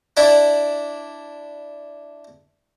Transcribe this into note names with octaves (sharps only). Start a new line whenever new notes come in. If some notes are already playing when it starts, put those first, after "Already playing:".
D4 E4 D5